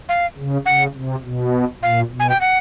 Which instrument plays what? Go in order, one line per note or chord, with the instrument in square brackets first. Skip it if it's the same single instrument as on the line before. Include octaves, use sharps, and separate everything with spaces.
[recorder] F5
[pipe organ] C#3
[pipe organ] C#3 [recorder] F#5
[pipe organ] C3
B2
[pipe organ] A#2 [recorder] F5
[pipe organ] B2
[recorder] G#5
G5
F#5